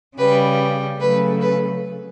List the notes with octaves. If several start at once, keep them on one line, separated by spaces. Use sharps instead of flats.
C#3 G3 B4
C#3 F#3 A3 B4
B4